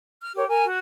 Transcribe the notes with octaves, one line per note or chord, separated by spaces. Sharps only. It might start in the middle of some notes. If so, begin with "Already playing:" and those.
F6
G4 A#4 C#5
A#4 G#5
F#4